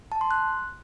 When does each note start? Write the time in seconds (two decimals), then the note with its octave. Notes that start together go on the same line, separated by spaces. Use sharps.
0.12 A5
0.21 C6
0.31 F#6